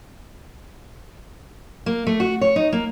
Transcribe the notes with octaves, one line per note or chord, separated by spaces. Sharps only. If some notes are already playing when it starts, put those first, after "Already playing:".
A#3
A3
F#4
C#5
D#4
A#3